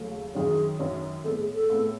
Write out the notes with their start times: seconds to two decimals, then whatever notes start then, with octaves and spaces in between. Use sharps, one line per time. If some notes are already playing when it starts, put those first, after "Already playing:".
Already playing: D#2 C#3 F#3 A3
0.35 F#2 D#3 F#3 C#4 G#4
0.79 F#2 D#3 F#3 C#4
1.24 A2 G#3 B3 A4
1.39 G#4
1.54 A4
1.70 A2 G#3 B3